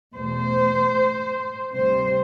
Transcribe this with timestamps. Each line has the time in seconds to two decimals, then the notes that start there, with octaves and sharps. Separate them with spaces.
0.14 E2 B2 A3 C5
1.73 D2 C3 G3 C5